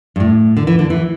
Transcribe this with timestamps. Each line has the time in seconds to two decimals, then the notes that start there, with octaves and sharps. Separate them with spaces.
0.16 G2
0.20 A2
0.57 D3
0.67 E3
0.79 D3
0.90 E3